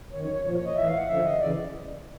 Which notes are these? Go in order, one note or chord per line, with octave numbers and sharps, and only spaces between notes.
F#2 D#3 C#5
C#5
C#5
A#2 F3 C#5
C#5
D#5
A2 E3 E5
F5
F#5
F#2 D3 F3 E5
D#5
C#3 E3 D5